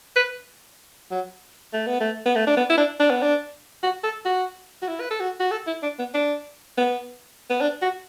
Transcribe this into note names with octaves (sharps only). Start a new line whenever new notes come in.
B4
F#3
A3
B3
A3
B3
A3
D4
B3
E4
D4
D4
B3
D4
F#4
A4
F#4
F#4
E4
B4
A4
F#4
F#4
A4
E4
D4
B3
D4
B3
B3
D4
F#4